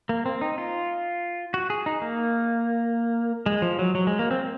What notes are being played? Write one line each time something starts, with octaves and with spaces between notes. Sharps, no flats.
A#3
C4
D#4
F4
F#4
G#4
D#4
A#3
G#3
F3
F#3
F#3
G#3
A#3
C4